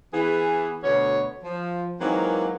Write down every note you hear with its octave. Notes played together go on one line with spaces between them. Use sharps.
E3 B3 G#4
D2 B2 B3 C#5
F3
E3 F#3 G#3 A#3 C4 D#4